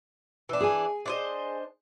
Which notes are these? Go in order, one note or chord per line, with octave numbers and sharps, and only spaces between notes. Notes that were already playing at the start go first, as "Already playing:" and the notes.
E3 D4
G#4 G#5
D4 C5 D#5